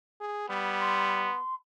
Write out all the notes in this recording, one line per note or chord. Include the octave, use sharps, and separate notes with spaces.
G#4
G3 B3
C6